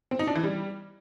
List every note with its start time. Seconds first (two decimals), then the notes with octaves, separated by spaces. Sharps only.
0.11 C4
0.19 D#4
0.27 D4
0.36 E3
0.44 G3